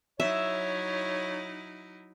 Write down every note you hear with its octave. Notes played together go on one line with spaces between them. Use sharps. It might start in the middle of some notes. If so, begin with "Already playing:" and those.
F#3 D#4 E4 C#5 E5